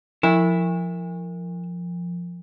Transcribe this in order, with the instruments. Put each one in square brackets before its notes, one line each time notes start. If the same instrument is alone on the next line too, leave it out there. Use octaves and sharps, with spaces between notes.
[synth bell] F3 [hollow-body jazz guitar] E4